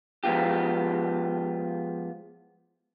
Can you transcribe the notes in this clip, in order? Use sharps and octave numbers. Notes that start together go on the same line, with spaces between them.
F3 G#3 B3 F4 G4